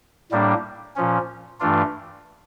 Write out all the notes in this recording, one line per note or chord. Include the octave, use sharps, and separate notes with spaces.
A2 G3 A#3 D4
A#2 F3 C#4
G2 E3 A3 D4 F4